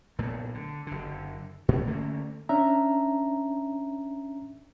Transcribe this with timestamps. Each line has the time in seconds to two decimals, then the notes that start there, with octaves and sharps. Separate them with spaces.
0.19 B1 A#2 A3
0.54 D3
0.87 F#1 D3
1.68 A#2 A3 A#3 C4
1.87 D3 A3 A#3 C#4
2.49 C#4 D4 E5 A#5